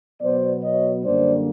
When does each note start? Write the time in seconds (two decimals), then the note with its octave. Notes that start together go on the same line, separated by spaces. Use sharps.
0.22 B2 F#3 B3 C5 D5
0.63 C#5 D#5
1.04 F#2 D3 G3 A#3 D4 C5 D5